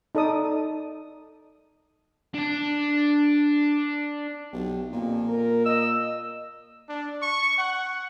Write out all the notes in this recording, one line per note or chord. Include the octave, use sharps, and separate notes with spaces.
D#4 A4 D5 A5 D#6
D4 D5
B1 G4
F2 A#2
A#4
D#5 E6
D4
C#6
F#5